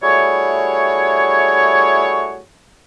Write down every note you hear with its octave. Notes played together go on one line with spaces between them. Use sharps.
G3 A3 E4 F#4 G#4 C#5